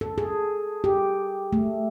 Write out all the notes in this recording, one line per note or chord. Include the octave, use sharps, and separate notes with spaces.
A4
G#4
G4
A3